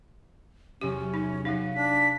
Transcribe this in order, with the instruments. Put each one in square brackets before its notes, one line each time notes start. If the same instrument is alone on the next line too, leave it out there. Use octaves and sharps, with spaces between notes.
[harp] E2 C3 F#3 [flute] C#4 [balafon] G4
[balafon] D#4
[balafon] F#3 D#4 [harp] B4 F5 [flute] F#5
[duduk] D4 [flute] B6